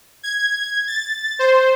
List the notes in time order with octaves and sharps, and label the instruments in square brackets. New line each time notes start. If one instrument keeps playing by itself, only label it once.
[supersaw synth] G#6
A6
C5